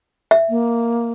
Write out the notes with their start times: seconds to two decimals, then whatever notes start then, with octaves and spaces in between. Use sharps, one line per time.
0.31 E5
0.50 A#3